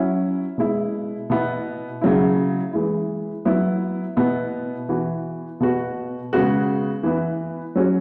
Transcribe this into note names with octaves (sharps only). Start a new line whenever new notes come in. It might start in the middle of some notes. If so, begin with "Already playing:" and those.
Already playing: F#3 C#4 E4
B2 G#3 E4
B2 B3 E4
C#3 F#3 E4
E3 G#3 E4
F#3 B3 E4
B2 B3 E4
E3 B3 F#4
B2 B3 F#4
C#3 G#3 B3 F#4
E3 B3 E4
F#3 C#4 F#4